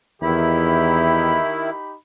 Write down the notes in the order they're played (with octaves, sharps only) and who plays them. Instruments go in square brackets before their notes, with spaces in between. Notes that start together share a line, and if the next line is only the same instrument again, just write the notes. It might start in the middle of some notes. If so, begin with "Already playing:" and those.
[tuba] E2 [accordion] D#3 E4 [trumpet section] D#4 G4 B5